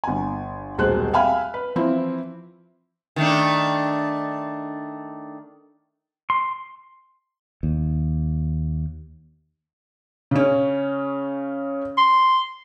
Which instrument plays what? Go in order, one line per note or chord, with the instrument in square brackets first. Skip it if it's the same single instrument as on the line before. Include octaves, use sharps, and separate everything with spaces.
[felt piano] G1 G#5
D#1 B1 G#3 C5 F#6
E5 F5 G5 G#5 B5 F6
B4
E3 F3 C4 E4
[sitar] D#3 A3 D4
[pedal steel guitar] C6
[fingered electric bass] D#2
[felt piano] C#3 C#4
[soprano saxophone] C6